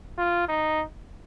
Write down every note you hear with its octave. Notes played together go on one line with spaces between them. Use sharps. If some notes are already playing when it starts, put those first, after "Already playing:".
F4
D#4